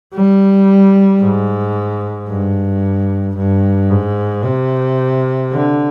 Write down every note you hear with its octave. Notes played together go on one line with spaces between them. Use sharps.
G3
G#2
G2
G2
G#2
C3
D3